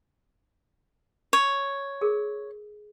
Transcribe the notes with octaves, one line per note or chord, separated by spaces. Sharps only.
C#5
G#4 A#4